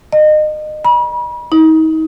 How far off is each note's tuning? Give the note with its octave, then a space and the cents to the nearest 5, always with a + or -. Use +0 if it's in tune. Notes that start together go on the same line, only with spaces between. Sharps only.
D#5 -30
B5 -40
D#4 +35